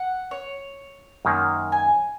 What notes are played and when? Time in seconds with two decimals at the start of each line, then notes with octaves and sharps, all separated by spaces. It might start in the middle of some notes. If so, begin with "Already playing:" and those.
Already playing: F#5
0.31 C#5
1.25 F#2 D#3 A#3
1.72 G#5